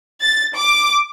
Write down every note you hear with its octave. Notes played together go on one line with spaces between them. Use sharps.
A6
D6